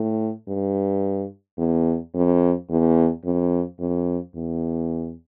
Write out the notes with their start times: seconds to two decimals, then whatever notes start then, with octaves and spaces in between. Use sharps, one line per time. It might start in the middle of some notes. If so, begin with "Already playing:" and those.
Already playing: A2
0.48 G2
1.58 E2
2.15 F2
2.70 E2
3.25 F2
3.80 F2
4.35 E2